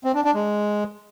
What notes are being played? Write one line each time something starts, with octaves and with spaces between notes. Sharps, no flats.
C4
D4
D4
G#3